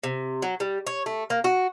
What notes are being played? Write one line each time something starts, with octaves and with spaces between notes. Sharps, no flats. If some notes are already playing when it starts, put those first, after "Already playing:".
C3
F#3
G3
C#5
A3
A#3
F#4